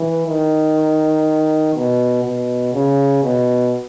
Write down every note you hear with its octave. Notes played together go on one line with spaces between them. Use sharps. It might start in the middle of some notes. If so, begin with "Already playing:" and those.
Already playing: E3
D#3
B2
B2
C#3
B2